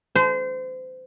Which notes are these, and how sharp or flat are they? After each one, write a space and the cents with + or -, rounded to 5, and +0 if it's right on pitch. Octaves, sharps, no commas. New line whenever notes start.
C5 -30